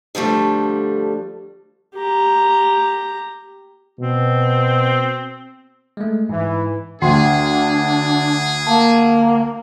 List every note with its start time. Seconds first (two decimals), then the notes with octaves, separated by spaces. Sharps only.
0.15 D3 F3 G3 A3 D4
1.95 G4 A#5
4.00 B2 C4
5.97 G#3 A3
6.29 G#2 E3
7.02 D2 D4 G#4 G5 C6 C7
8.67 A#3 A5